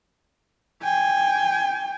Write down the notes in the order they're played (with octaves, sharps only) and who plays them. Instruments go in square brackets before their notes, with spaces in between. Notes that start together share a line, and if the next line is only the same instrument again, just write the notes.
[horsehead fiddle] G5 G#5